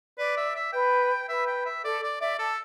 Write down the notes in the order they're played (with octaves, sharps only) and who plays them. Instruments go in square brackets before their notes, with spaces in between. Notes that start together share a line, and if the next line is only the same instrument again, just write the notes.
[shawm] B4 [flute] D5
[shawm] E5
E5
[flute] B4 [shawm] G5
[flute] B4 [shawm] E5
[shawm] G5
E5
[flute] A4 [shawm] D5
[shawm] D5
[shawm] D5 [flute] E5
[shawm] A4 [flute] A5